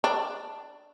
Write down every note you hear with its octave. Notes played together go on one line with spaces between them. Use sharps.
D4